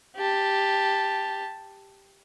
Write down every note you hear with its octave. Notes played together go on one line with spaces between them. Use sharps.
G4 A5